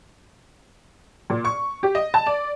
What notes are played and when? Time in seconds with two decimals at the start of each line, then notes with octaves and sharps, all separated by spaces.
1.30 A#2
1.45 C#6
1.83 G4
1.95 D#5
2.14 A5
2.27 D5